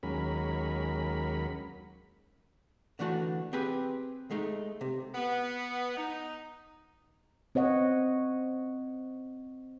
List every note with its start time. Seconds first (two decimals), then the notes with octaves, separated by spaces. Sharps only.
0.03 D#2 F#3 G#3 C#4 A#4 B5
2.99 D3 E3 A3 F#4
3.53 C4 G4 G#4 B4
4.31 G#3 A3 D#4
4.81 C3
5.15 B3
5.96 D#4
7.55 C4 C#5 D#5 F#5